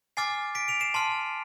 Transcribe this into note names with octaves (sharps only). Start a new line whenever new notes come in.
G#5 D6 F6 A6 C7
B6 D7
D7 F7
C7 E7
A5 C6 F6